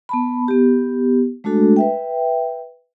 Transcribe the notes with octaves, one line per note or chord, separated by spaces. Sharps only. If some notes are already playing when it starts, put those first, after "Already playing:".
B3 A5 B5
B3 G4
G#3 A3 D4 F#4 A4
B4 E5 G5